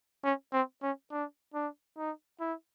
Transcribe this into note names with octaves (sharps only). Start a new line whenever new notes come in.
C#4
C4
C#4
D4
D4
D#4
E4